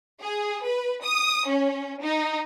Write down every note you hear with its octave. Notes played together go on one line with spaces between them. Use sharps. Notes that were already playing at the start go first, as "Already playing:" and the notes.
G#4
B4
D#6
C#4
D#4